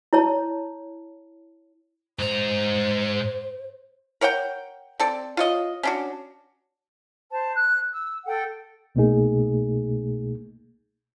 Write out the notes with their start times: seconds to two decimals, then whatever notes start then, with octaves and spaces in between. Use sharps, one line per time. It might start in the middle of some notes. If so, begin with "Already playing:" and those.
0.13 E4 C#5 A5
2.19 G#2 C5 A#5
4.21 A#4 C#5 F#5 G5
5.00 C4 A4 D5
5.37 F4 C#5 D#5
5.83 C#4 D4 F#4
7.31 C5 A5
7.55 F#6
7.91 E6
8.24 A4 F#5 G5
8.95 C2 B2 A3 A#3 D#4 G#4